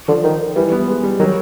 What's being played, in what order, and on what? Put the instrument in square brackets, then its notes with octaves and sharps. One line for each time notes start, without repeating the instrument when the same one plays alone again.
[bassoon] D3 [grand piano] F3
[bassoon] D#3
[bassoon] E3 [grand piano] G3
[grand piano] B3
G#3
G3
[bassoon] D#3 [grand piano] F#3